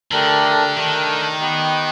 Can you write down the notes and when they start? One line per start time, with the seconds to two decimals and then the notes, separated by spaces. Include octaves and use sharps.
0.12 D3 A3 D4 G4 A#4
0.76 D#3 A3 D4 G4 A#4
1.41 B3 D#4 G4 B4